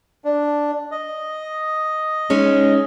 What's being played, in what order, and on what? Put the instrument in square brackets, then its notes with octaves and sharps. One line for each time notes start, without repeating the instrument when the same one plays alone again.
[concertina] D4
D#5
[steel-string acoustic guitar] G#3 C#4 D#4